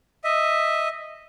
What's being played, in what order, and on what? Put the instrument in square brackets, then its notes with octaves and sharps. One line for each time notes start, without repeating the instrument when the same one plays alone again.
[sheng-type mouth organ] D#5 E5